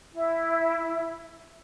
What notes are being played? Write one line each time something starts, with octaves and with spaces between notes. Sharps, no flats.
E4